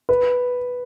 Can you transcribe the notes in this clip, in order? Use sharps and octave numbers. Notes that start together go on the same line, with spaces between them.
B4